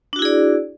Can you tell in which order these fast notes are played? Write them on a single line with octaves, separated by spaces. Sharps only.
D4 F#4 E4 G#4 D5